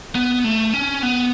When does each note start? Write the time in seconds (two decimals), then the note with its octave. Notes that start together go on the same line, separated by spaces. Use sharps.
0.15 B3
0.44 A3
0.74 C#4
1.02 B3